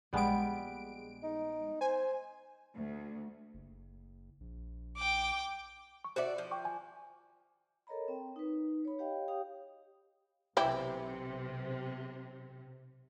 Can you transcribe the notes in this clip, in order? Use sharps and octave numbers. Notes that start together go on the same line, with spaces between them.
A#1 G3 G#3 B3 D7
D#4
C5 G#5
D2
F#1
A#1
G5 D6
C#6
F#4 A4 C5 D5 E5
F3
G5 C#6 D6
G#5
A4 A#4 C#5 D#5 A#5 B5
C4 G5
D#4 B4
C#5 B5
G4 C#5 D#5 F5 G5
G4 C#5 F5 G5 D#6
B1 C3 E3 E4 G4